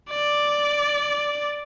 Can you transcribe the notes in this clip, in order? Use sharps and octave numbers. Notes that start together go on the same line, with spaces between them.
D5